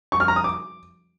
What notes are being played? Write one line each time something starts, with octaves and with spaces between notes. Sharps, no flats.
C#6
F6
A#5
D#6
D6